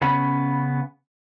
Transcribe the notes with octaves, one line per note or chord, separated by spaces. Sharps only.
C#3 B3 C#4 B5